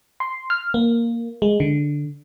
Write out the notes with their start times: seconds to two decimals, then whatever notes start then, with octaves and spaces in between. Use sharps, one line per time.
0.20 C6
0.50 F6
0.74 A#3
1.42 G#3
1.60 D3